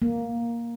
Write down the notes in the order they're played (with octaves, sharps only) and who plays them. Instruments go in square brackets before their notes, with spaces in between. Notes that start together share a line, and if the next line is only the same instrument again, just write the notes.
[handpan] A#3